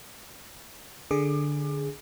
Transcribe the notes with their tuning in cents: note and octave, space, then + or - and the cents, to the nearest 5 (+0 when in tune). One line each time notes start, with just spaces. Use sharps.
D3 +0 G#4 +0 D6 +25